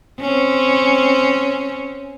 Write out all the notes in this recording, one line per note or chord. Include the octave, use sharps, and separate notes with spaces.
C4 C#4